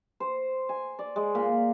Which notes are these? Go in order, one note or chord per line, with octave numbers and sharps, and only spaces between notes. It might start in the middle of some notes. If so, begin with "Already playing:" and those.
C5
G#5
D5
G#3
A#2